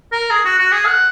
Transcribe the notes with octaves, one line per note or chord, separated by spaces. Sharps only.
A#4
G#4
F#4
F#4
G#4
F#5